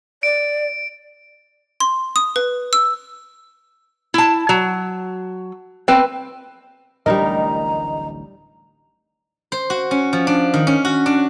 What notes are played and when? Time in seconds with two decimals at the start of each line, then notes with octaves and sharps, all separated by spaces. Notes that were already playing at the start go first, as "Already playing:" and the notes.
0.23 D5 D7
1.80 C6
2.16 D#6
2.36 B4
2.73 E6
4.14 E4 A5
4.49 F#3
5.88 C4 B4 G5
7.06 D1 A1 G3 D4 D#4 A#4 D#5 A#5
9.52 C5
9.70 F#4
9.91 C#4
10.13 F3
10.27 D4
10.54 D#3
10.67 C#4
10.85 F#4
11.06 D4